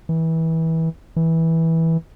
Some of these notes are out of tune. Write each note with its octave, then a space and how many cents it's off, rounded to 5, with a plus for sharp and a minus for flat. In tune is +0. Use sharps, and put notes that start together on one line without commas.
E3 -25
E3 -15